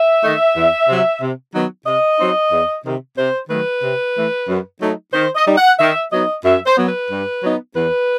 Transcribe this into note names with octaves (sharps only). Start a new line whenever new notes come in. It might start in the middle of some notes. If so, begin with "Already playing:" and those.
Already playing: E5
D#3 A3 D#4
E2
C3 F#3
C3
D#3 F#3 B3 D#4
C3 D#5
F#3 C4 D#4
E2
C3 D#3
C3 C5
D#3 F#3 A3 B4
C3
E3 A3
F#2
F#3 A3 D#4
D#3 C5
D#5
G3 D#4
F#5
D#3 E5
F#3 B3 D#4 D#5
F#2 E5
C5
F#3 B3
B4
G2
F#3 B3 D#4
E2 B4